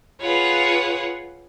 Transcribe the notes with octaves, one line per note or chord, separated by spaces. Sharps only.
F4 G#4 B4 C#5 F5 F#5